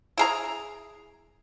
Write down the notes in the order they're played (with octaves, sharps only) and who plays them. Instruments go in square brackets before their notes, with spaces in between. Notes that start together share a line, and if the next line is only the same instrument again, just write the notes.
[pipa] E4 G#4 A#5